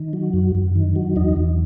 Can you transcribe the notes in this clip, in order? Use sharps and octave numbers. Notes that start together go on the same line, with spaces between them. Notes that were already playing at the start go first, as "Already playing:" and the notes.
Already playing: D#3
F#3
F#2
F#2
D#3
F#3
E2 D#4
E2